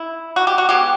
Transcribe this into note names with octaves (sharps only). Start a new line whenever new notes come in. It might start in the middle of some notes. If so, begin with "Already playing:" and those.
Already playing: E4
F#4
G4
F#4
B2 G#3 B3 G4